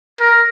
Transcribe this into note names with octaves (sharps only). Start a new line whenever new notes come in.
A#4